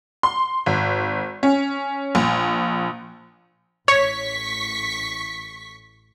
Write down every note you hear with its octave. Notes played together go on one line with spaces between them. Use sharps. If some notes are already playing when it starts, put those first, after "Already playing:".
C6
G#1
C#4
A#1
A1 C#5 C#6 B6